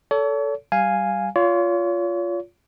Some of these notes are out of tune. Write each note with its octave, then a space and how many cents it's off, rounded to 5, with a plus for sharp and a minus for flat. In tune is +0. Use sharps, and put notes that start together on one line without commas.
A4 +0 C#5 +40
G3 -15 F5 +0 G#5 +0
F4 +0 C#5 +40